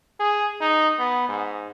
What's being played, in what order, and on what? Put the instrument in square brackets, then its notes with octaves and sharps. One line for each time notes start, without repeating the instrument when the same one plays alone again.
[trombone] G#4
D#4
B3
G#2